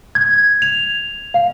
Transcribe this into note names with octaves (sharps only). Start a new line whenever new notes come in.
G#6
F7
F5